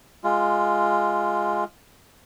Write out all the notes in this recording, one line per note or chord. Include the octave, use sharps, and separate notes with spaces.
G#3 F4